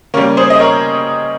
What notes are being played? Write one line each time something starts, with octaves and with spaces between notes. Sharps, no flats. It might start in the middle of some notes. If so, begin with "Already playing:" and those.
C#3 G3 A#3 C#4
G#4 C5
D#5
A#4 C#5